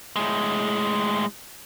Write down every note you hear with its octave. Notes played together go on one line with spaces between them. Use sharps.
A2 G#3